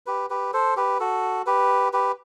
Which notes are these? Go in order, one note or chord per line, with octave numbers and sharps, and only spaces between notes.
G4 B4
G4 B4
A4 C5
G4 B4
F#4 A4
G4 B4
G4 B4